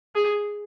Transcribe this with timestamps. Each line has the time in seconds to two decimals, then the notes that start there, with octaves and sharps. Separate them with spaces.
0.15 G#4